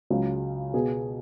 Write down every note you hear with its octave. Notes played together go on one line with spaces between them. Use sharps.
C#2 C#3 F#3
B2 B3 G#4